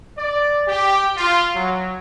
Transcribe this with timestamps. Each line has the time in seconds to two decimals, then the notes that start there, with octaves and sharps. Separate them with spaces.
0.18 D5
0.67 G4
1.17 F4
1.56 F#3